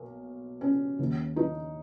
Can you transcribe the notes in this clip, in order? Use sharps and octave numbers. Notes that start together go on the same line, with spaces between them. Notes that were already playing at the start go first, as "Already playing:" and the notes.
Already playing: B1 B2 A#3
C#4
D#2 D#3
D#4